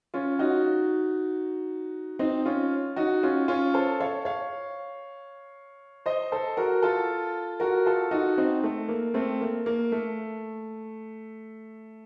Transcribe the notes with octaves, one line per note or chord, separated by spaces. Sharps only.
C#4 F4
D#4 F#4
C4 D#4
C#4 F4
D#4 F#4
C#4 F4
C#4 F4
A4 C5
C#5 F5
C#5 F5
C5 D#5
A4 C5
F#4 A#4
F4 A4
F#4 A#4
F4 A4
D#4 F#4
C4 D#4
A3
A#3
A3 C4
A#3
A#3
A3